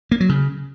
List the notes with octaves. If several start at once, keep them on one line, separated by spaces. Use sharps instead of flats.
A#3
F#3
C#3